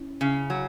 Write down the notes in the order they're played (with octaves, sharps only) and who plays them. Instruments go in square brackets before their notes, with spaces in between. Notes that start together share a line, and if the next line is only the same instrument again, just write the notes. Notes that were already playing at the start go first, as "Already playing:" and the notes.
Already playing: [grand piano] C#4 E4
[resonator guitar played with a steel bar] C#3
F#3